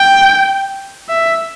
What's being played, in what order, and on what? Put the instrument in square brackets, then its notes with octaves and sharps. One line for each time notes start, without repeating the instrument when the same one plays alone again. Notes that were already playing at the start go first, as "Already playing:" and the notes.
Already playing: [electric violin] G5
E5